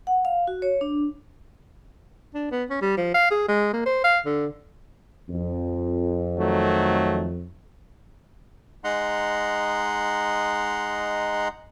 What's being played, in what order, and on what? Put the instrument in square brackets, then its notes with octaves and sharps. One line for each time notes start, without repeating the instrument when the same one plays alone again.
[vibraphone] F#5
F5
F#4
C#5
D4
[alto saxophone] D4
B3
C#4
G3
F3
F5
G#4
G#3
A#3
C5
F5
D3
[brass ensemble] F2
[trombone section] D#3 F#3 A3
[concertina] G#3 D#4 F#5 A#5 C6